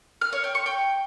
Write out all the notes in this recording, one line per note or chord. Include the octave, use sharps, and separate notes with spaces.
F6
C#5
G5
C#6
G5